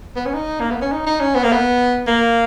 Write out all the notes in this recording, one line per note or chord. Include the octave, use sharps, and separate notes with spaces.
B3
C#4
D#4
A#3
B3
C#4
D#4
D#4
C#4
B3
A#3
B3
A#3